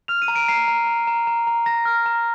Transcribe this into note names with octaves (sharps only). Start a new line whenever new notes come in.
F6 F7
D#7
A#5
D7
A#5 C7
A#5
A#5
A#5
A#5
A#5
A#5 A#6
F6
A#5